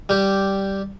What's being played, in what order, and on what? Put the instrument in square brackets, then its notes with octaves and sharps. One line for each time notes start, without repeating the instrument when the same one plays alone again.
[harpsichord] G3 G4